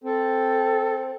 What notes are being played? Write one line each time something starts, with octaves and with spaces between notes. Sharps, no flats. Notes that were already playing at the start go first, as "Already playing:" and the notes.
C4 A4